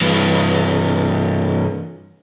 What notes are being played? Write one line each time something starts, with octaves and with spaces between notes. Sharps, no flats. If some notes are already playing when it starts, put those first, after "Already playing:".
G2 E3